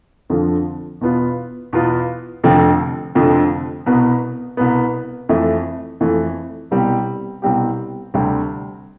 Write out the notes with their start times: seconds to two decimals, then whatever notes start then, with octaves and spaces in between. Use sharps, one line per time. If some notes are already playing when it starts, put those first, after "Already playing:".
0.30 F2 D3 F3
1.01 E2 B2 B3 F4
1.73 E2 B2 B3 F4
2.44 F1 F2 D3 F3 C4
3.15 F1 F2 D3 F3 C4
3.86 C2 B2 B3
4.57 C2 B2 B3
5.29 F2 E3 A3
6.00 F2 E3 A3
6.71 C2 B2 G3 C4 G4
7.42 C2 B2 G3 C4 G4
8.14 D2 C3 G3 C4